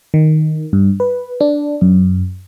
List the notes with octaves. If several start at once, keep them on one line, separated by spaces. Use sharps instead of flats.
D#3
G2
B4
D4
F#2